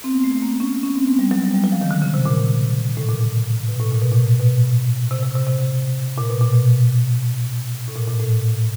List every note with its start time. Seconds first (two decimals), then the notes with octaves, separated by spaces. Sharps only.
0.04 C4
0.12 B3
0.24 A3
0.36 A3
0.42 A#3
0.48 B3
0.60 C#4
0.83 C#4
0.95 C4
1.07 B3
1.19 G3
1.31 F#3
1.43 G3
1.54 G3
1.64 F#3
1.72 F3
1.81 D#3
1.91 D3
2.02 C#3
2.14 C3
2.26 A#2
2.97 A2
3.09 A#2
3.21 A#2
3.69 B2
3.80 A2
3.92 A#2
4.02 B2
4.12 A#2
4.40 B2
5.11 C3
5.23 C3
5.35 C3
5.47 C3
6.18 A#2
6.30 B2
6.41 A#2
6.53 B2
7.88 A2
7.96 A#2
8.08 A#2
8.20 A2